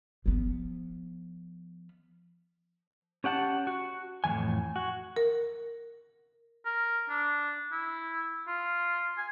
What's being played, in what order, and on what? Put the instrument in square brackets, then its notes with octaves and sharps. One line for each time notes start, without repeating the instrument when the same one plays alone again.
[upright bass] F3 B3
[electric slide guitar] C#4 G4 F#5 A5
F#4
F2 A2 C#3 E3 G#5
F#4
[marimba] A#4
[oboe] A#4
D4
E4
F4
G#5